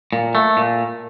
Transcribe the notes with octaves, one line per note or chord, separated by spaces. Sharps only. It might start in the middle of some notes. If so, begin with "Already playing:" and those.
A#2
A3
A#2